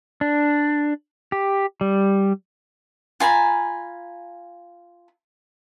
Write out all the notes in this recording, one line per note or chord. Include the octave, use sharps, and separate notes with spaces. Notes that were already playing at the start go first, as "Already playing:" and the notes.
D4
G4
G3
F4 G#5 A#5 B5